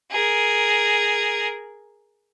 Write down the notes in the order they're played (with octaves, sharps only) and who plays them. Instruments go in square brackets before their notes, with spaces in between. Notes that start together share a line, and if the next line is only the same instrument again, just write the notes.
[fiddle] G#4 A#4